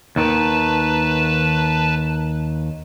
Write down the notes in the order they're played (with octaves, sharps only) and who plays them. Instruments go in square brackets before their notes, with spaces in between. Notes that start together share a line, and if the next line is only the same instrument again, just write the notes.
[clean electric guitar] D#2 D#3 [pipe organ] B4 A5